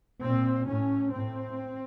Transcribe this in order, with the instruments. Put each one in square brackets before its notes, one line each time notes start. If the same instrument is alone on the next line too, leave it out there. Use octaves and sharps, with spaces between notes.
[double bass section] A#2 C4
A2 C#4
A2 C4